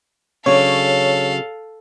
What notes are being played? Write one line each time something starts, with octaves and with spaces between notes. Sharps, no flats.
C#3 F#3 D4 A4 C#5 F5